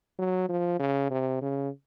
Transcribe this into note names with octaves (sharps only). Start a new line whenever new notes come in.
F#3
F3
C#3
C3
C#3